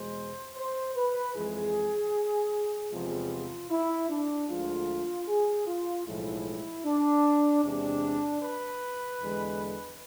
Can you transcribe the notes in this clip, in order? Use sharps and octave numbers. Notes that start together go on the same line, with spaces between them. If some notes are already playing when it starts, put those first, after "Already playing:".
Already playing: E2 B2 G#3 C5
C5
B4
F2 E3 G#3 G#4
E2 C3 F3 G#3 F4
E4
D4
D2 D3 F3 G#3 F4
G#4
F4
B1 A2 F3 G#3 E4
D4
E2 C3 G#3 D4
B4
E2 D3 G#3